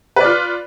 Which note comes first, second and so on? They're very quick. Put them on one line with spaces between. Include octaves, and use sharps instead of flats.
B4 D5 F4